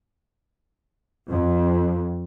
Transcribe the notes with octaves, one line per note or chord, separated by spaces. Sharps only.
F2